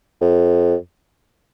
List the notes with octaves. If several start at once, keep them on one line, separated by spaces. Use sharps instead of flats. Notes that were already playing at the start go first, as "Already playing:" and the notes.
F2